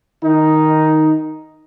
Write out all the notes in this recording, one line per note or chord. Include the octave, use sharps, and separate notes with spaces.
D#3 D#4